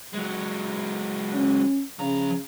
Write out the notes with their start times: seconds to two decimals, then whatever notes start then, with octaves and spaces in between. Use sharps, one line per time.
0.13 F#3 G#3
1.32 C#4
1.99 C#3 F3 A#5